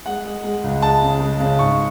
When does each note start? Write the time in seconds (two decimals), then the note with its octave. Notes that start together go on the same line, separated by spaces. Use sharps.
0.06 G#3 F#5
0.25 G#3
0.44 G#3
0.64 C#2
0.82 G#3 A5
1.02 C#3
1.21 G#3
1.40 C#3
1.59 G#2 C#6